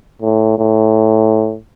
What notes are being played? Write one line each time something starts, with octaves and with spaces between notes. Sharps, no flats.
A2
A2